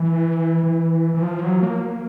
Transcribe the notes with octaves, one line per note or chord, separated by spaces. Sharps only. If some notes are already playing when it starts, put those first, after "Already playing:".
Already playing: E3
E3
E3
F3
F#3
A#3